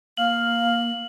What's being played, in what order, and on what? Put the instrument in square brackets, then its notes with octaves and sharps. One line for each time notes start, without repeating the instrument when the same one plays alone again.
[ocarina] A#3 [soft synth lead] F5 [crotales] F#7